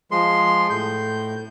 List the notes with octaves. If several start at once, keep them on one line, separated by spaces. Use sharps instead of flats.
F3 G#3 C6
A2 G6